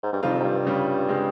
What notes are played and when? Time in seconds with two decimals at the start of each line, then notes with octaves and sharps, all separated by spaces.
0.03 G#2
0.13 G2
0.22 F2 C3 D#3 G3 C4 F4
0.40 G#2
0.44 G2
0.65 C#3 G3 C#4 F4
1.08 C#3 G#3 C4